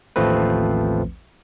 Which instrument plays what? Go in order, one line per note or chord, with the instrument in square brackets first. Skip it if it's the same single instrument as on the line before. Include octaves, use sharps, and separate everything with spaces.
[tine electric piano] A1 D#2 F3 A3 C4 B4